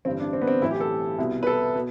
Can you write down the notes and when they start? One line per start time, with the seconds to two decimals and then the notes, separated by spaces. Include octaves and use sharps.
0.05 A1 G2 D3 C4
0.19 D4
0.33 C4
0.41 B3
0.47 C4
0.62 B1 A2 E3 E4
0.71 G4
0.80 A4
1.18 C2 B2
1.43 B4
1.47 A4
1.75 B2